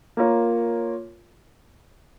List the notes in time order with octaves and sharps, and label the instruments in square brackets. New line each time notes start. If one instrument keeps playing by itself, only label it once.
[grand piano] A#3 F4 A#4 C#5